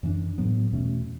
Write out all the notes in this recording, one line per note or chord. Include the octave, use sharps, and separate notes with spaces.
F#2 E3 B3 D4
A2 F#3 B3
E2 B2 A3 C#4